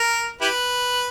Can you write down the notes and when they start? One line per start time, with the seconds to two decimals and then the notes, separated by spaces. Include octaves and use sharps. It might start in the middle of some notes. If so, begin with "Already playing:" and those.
Already playing: A#4
0.41 E4 G4 B4